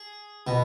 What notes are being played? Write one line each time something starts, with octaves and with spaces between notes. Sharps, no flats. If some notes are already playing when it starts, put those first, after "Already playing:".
Already playing: G#4
B2